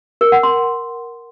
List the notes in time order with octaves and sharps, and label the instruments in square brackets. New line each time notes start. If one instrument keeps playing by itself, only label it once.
[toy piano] A#4
F#5
C6